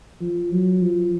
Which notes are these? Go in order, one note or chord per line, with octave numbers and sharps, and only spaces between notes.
F3
F#3
F3